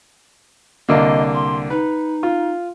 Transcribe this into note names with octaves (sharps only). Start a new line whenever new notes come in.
C2 D3 A#3 D#5
C6
D#4 B4
F4